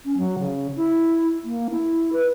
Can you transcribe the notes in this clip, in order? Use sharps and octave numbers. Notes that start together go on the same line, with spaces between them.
C#4
F#3
C#3
E4
A#3
E4
B4